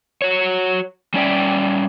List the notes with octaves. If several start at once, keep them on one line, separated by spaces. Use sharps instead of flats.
F#4 C#5
G3 C#4 D5 E5 G5